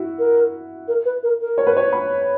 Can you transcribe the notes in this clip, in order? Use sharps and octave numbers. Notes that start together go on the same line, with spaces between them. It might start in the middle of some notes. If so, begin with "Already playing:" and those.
Already playing: E4 F#4
A#4
A#4
B4
A#4
A#4
C#5
B4
C#5
B5